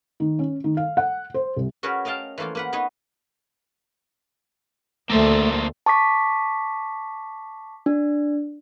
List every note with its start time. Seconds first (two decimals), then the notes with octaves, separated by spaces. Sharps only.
0.20 D#3
0.39 C#4
0.64 D#3
0.77 F5
0.97 F#5
1.34 C5
1.56 C2
1.83 C#4 F#4 G#4 A#4 B4 C#5
2.05 A#4 D#5 F5 G5 A5
2.38 E3 F3 A3 A#3 F4
2.55 A#3 B4 F#5
2.73 B3 D#4 B4 C#5 D#5
5.10 D2 A3 A#3 A4 C5
5.86 A5 C#6 D6 B6
7.86 D4